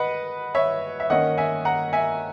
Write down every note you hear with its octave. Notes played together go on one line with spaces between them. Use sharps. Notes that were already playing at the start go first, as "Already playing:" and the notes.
Already playing: B4 D#5 F#5
C#5 E5
E5
D#3 A#3 C#4 D#5 F#5
E5 G#5
F#5 A#5
E5 G#5